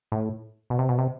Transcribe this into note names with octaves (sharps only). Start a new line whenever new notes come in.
A2
B2
C3
B2
C3